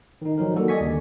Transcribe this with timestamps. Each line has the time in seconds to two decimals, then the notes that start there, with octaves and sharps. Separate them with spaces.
0.22 D#3 D#4
0.38 D#3 F3 F#3 D#4 A#4
0.56 D#3 G3 A#3 F#4 A4
0.68 D5 D#5 G#5 C#6 B6
0.80 D#2 D3